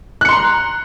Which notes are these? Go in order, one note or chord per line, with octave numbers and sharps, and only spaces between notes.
A#5 C6 F#6 C#7